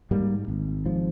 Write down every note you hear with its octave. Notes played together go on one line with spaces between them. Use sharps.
G#2 G3 A#3
G#1
G#2 F3